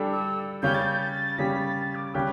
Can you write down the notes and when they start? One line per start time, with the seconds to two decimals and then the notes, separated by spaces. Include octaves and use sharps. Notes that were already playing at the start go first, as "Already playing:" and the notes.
Already playing: G3 D4 A4
0.12 E6
0.62 C#3 G3 C#4 G6
0.74 A6
0.86 G6
1.00 A6
1.38 C#3 G3 C#4 B6
1.58 A6
1.77 A6
1.95 D6
2.14 C#3 G3 C#4 G4 F#6